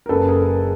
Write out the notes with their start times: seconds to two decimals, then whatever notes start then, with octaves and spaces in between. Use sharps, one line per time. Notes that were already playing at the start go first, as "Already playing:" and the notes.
0.06 A#4
0.09 F#1 F#2 C#3 A4 B4
0.28 G#4 A#4